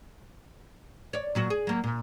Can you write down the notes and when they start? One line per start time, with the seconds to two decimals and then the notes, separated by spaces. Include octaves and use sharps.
1.13 C#5 D5
1.35 A#2 F#3 F#4
1.50 G#4
1.67 F#3 A#3
1.84 A#2